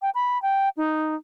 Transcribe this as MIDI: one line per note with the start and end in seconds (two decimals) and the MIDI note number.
0.02 0.10 79
0.15 0.41 83
0.42 0.69 79
0.77 1.15 63